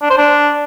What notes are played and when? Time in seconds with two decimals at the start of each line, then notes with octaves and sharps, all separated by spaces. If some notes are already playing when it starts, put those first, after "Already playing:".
0.02 D4
0.10 C5
0.17 D4